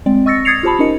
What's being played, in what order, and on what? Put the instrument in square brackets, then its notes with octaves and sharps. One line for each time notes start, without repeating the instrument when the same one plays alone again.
[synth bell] G#3 C4 D5
D#5 C#6 E6 A6 A#6 C#7
D#6 G#6 A6 C7 C#7 F7
F4 G4 C5 A5 B5
C#4 D#4 A#4 D#5 C#7